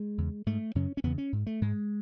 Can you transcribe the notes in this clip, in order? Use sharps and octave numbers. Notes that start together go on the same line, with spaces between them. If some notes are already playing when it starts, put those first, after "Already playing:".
Already playing: G#3
E2 C#3
G#2 A3
F#2 C#3 C#4
C#4
E2 C#3 B3
C#4
G#2
A3
G#2 G#3